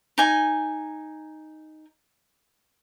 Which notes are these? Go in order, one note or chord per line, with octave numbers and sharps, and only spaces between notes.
D#4 G#5